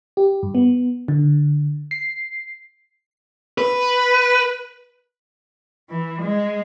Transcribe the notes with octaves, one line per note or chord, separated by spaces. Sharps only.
G4
G2
B3
D3
C7
B4
E3
G#3